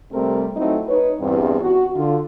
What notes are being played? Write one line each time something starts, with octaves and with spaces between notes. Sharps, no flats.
C3 G3 A3 C4 G4 A#4
F#3 A3 C4 D#4 E4 F#4
D#4 B4 C#5
E2 G2 C4
F#4
D3 F4